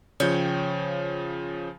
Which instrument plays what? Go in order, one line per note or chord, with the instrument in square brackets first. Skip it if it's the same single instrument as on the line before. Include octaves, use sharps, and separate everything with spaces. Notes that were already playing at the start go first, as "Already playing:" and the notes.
[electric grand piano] C#3 F3 [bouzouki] C#5 G5